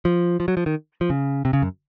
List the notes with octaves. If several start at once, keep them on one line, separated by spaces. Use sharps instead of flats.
F3
F3
F#3
F3
D#3
F3
C#3
C3
C#3
F#2